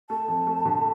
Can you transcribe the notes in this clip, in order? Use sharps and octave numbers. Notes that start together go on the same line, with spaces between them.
A3 A5
F2
A3
D3